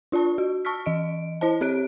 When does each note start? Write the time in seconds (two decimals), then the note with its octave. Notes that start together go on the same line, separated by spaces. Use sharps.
0.12 D4 F4 D5 A5 C#6
0.38 F#4
0.65 A5 C#6 E6 F6 B6
0.86 E3 D#5 D7
1.41 E4 C5 D#5 A5
1.61 C4 G4 C#5 F#6 D7